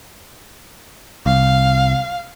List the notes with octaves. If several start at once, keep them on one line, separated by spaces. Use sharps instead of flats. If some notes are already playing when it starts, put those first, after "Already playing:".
C2 F5